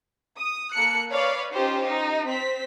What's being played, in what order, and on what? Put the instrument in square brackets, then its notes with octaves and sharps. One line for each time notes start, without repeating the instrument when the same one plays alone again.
[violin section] D#6
A#3 A4 F#6 C#7
B4 C#5 D5 F5
C#4 D#4 F4 G4 C5
D#4
C4 C5 B6